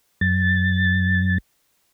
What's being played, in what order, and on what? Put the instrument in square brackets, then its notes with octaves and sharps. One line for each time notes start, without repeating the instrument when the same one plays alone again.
[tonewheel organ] F#2 A6